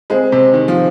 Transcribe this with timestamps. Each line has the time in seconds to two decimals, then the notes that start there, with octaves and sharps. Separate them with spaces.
0.10 G#3 C4 G#4 C5
0.32 C3
0.54 D#3
0.68 F3